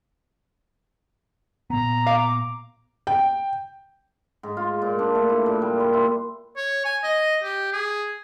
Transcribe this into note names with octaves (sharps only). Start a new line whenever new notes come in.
A#2 B3 A#5
F5 D6
G5
G#2
F4
A#2
D4
A3
E4
A#2
G3
C6
E4
C#5
G#5
D#5
G4
G#4